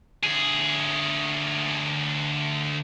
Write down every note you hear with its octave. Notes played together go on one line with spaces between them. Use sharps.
D2 G#4